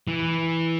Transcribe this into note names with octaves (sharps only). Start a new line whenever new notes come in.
E3